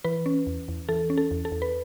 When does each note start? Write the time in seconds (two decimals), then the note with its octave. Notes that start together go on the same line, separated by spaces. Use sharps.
0.04 E3 B4
0.26 C#4
0.47 E2
0.68 E2
0.89 E3 A4
1.10 C#4
1.17 A4
1.31 E2
1.45 A4
1.52 E2
1.62 B4